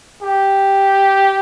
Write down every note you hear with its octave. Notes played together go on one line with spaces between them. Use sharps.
G4